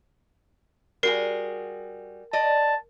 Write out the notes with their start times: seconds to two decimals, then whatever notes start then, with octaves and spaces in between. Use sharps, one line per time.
1.03 G3 F#4 G#4 A#4 C7
2.33 D5 D#5 A5